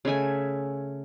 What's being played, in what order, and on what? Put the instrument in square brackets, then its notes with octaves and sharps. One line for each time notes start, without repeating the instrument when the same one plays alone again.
[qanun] C#3 A3 E5 G#5